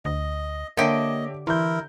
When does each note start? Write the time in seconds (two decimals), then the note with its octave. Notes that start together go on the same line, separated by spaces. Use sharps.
0.05 D2 D#5
0.77 D3 A#3 G4 C#5 D#5 E5 A5
1.47 E3 E4 A#4 C6 G6